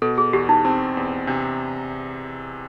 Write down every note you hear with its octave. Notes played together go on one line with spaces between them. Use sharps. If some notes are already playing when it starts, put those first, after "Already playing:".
B2 A4
G#4
E2 G4
D#4
C4 D#4
E2
C3 D4